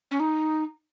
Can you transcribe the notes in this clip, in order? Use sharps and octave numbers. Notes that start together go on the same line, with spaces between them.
C#4
D#4